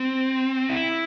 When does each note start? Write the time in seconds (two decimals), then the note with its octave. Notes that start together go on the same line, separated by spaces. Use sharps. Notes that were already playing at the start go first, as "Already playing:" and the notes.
Already playing: C4
0.69 E4